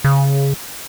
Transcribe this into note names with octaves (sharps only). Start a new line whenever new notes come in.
C#3